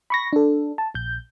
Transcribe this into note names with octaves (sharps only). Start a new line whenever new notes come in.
B5 C#6 A#6
D4 A4
A5
A#1 G6